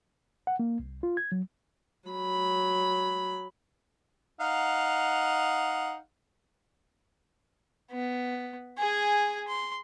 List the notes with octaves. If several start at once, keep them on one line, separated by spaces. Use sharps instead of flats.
F#5
A#3
C2
F4
G#6
F#3
F#3 B5
D#4 F5 F#5
B3
G#4 G#5
C6